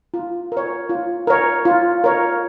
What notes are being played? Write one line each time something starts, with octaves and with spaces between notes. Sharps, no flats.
F4
A#4 C#5
F4
A#4 C#5
F4
A#4 C#5